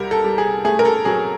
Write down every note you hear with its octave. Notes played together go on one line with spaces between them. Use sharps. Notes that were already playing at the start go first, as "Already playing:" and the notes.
Already playing: C2 G3 A#4
A4
G3
G#4
A3 G#4
A#4
A4
F#3 G#4